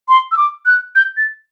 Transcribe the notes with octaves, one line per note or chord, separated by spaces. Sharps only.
C6
E6
D6
F#6
G6
A6